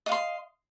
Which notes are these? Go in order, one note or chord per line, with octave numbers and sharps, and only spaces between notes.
D#5 F5 C6